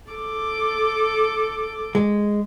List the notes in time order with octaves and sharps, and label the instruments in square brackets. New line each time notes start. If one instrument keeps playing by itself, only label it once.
[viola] A4 D6
[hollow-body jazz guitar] G#3